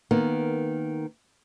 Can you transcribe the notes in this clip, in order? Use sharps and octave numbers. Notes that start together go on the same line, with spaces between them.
D#3 A#3 B3